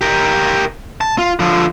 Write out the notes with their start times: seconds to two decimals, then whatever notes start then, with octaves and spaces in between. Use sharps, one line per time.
0.01 G4 A#4
1.01 A5
1.18 F4
1.39 D3 F3